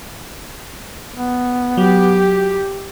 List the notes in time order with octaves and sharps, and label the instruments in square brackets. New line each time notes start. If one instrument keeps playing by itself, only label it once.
[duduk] B3
[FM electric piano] F#3 [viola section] G4